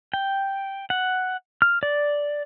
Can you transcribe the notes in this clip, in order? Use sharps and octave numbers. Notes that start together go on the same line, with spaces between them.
G5
F#5
F6
D5